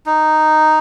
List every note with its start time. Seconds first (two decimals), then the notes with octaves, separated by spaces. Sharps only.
0.06 D#4